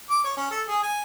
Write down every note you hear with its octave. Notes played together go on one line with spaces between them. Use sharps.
D6
C#5
C#4
A4
G#4
G#5